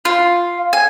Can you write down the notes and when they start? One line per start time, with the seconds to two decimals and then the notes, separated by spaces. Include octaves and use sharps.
0.05 F4
0.73 G#5